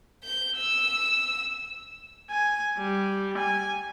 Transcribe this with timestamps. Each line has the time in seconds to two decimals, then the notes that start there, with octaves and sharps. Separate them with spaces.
0.24 G6
0.57 E6
2.31 G#5
2.78 G3
3.37 G#5